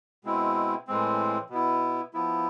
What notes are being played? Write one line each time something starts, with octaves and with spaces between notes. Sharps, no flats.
B2 G#3 C4 E4
A2 E3 G#3 C4
B2 B3 E4
F3 B3 E4